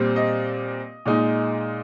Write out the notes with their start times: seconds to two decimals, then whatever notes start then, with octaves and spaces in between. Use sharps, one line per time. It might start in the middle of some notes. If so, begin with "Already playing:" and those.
Already playing: A#2 G3 C4
0.16 D#5
1.06 A#2 G#3 D#4